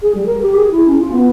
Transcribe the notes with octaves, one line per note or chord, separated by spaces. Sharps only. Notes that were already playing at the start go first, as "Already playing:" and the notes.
G#4
G3
A#4
G4
G#4
E4
C#4
F4
B3